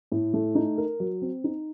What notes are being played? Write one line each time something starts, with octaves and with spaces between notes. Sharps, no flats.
A2
A3
D#4
A#4
F#3
C4
D#4